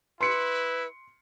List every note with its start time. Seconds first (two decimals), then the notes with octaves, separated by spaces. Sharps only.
0.21 E4 B4 C6 C#7